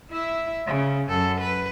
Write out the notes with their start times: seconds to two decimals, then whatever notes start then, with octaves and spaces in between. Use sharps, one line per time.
0.11 E4 E5
0.66 C#3
1.09 F#2 A4
1.41 B4